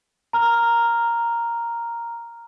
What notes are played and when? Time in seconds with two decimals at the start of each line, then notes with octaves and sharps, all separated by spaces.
0.33 A#5 F6